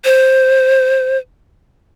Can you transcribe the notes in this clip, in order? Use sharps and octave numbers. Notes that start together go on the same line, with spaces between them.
C5